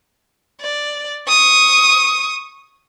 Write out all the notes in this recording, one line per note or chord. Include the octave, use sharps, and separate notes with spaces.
D5
C#6 D#6